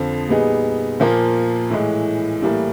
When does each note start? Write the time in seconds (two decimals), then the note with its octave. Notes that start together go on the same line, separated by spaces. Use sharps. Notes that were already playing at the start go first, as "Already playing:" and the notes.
Already playing: F2 D3 F3
0.29 A#2 G3 B3 D#4 G#4
1.00 A#2 F3 A#3
1.70 A2 E3 G#3
2.42 A2 E3 G3 A#3